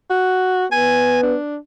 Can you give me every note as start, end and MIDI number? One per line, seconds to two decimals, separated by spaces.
0.10 0.66 66
0.72 1.35 59
0.72 1.20 80
1.23 1.57 62